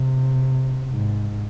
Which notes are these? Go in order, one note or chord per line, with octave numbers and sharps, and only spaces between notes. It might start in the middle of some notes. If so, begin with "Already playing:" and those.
Already playing: C3
G#2